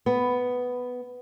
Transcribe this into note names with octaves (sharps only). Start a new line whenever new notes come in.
B3